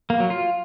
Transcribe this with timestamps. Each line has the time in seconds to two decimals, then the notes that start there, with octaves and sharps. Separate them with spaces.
0.10 A#3
0.20 F#3
0.30 F4